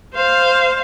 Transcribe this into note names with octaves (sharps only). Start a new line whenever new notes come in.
C5 F5